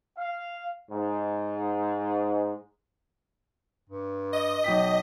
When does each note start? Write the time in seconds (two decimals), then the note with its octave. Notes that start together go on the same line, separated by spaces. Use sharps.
0.18 F5
0.91 G#2
3.89 G2
4.33 D#5
4.64 B1 G5 B6